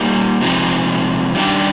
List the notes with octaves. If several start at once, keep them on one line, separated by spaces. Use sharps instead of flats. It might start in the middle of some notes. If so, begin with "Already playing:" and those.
Already playing: G3 A#3 D#4
C3 F3 G#3 C4 D#4
D#3 G3 A#3 D4 G4